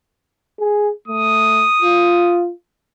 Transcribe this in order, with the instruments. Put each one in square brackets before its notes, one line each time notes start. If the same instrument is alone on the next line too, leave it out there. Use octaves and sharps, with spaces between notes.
[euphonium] G#4
[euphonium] A3 [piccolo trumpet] D#6
[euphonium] F4